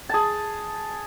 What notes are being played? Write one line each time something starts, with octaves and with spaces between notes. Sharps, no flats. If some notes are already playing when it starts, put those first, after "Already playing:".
G#4 A5